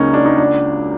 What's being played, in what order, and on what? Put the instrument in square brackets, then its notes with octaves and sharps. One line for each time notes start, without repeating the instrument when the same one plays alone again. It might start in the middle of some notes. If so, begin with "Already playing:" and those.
Already playing: [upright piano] C#2 C#3 F#3 A#3 [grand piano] C#4 D#4
[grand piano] D4
D#4
D4